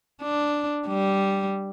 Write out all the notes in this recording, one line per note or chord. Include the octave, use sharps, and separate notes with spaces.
D4
G3